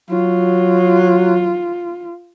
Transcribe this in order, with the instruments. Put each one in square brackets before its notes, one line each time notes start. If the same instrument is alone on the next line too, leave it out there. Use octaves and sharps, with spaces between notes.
[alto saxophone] F#3 [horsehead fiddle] F4